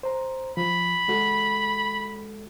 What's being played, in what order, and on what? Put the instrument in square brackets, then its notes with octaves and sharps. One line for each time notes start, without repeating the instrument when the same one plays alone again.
[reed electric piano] C5 A#5
[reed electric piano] F3 [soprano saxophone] B5
[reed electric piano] G#3 F#4 A4